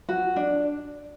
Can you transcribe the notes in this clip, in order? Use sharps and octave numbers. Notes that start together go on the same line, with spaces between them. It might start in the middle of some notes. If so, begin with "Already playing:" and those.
F#4
D4